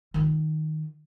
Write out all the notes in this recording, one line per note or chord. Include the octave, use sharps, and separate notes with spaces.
D#3 F4